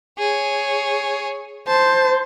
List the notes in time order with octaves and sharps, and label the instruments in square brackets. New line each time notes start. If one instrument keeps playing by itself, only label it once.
[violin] G#4 C#5
[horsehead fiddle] C5 [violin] A5